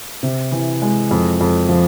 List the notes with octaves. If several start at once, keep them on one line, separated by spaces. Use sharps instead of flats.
C3
E3
G#3
F2
F2
F3